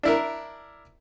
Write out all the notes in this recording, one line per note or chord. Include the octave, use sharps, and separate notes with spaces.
D4 E4 A#4